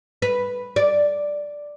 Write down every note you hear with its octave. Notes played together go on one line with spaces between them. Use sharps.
B4
D5